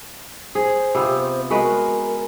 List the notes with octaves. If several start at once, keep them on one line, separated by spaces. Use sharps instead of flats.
G#4 C5
C3 B3 F4
G#3 F#4 A#4 B4